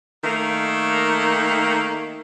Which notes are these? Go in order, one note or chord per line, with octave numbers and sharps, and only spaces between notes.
D#3 A3 A#3